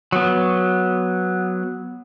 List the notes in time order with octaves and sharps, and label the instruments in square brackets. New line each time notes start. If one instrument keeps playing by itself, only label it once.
[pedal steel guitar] F#3 B3